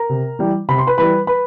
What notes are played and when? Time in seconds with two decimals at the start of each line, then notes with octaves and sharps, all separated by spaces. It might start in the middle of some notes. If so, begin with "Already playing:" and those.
Already playing: A#4 A#5
0.09 C3
0.39 E3 G3
0.69 C3 B5
0.78 C6
0.87 B4 B5
0.98 E3 G3 B4 B5
1.27 B4 B5